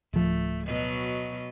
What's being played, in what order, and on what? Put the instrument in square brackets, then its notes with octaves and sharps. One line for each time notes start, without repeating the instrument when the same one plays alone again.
[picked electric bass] D1 F3 [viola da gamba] A3
[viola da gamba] B2 F#3 D#5